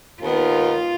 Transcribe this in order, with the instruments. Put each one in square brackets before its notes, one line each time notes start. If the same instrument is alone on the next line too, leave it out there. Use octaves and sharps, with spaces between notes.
[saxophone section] D#2 D#3 B3 [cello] F4